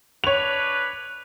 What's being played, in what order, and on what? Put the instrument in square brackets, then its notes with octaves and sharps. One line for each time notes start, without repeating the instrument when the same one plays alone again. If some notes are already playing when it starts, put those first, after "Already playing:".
[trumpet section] D4 B4 [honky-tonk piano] C#5 F7